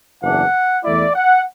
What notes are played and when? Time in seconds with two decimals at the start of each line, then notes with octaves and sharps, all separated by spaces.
0.21 F#1 E2 E3 D4 F#5
0.83 E2 E3 A3 E4 D5
1.15 F#5